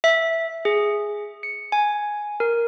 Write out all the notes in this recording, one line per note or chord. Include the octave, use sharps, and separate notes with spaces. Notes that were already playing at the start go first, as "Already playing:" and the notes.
E5
G#4
C#7
G#5
A#4